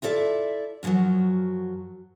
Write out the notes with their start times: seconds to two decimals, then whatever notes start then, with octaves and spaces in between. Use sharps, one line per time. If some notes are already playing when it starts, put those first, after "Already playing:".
0.02 E4 F4 A4 D5 E5
0.83 F#2 B2 D3 F3 F#3